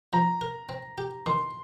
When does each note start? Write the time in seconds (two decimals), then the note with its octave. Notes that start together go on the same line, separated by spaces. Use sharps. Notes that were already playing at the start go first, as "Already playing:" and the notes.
0.13 F3 A#5
0.41 A#4
0.69 C4
0.98 G4
1.26 D#3 C6